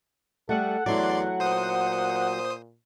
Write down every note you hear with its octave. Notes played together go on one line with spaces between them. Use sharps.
G3 A3 A4 F#5
E2 F#3 A3 E4 D5 C6
A#2 C5 D#6